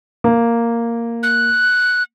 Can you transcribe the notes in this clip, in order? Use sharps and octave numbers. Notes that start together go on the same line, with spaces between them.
A#3
F#6